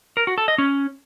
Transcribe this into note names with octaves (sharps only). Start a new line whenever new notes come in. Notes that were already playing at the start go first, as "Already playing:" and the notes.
A#4
F#4
A4
D#5
C#4